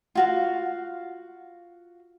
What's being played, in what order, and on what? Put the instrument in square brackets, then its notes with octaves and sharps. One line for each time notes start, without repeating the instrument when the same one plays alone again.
[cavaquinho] F4 F#4 F5